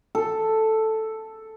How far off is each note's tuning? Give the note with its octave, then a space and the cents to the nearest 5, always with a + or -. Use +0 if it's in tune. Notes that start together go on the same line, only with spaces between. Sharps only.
A4 +0